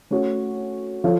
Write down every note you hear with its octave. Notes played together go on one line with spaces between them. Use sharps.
A3 C#4 F#4 C#5
F3 F4 A4 C#5